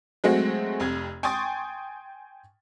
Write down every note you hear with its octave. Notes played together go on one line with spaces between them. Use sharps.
F#3 G#3 A3 C4 F#4
F1 F2 G#6
G5 G#5 C6 C#6 D#6 A6